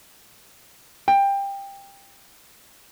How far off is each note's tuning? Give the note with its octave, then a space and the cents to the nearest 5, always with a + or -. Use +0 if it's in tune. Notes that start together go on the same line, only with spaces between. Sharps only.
G5 +20